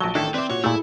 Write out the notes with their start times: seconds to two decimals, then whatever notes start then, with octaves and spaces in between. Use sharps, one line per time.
0.01 A#1 F#3 A5 G7
0.15 A1 D#3 D4 E4 A4 A5
0.34 C4 B4 D5 E5 D6
0.50 A#2 F#4 C#5
0.64 A#2 A3 E4 G#4 A4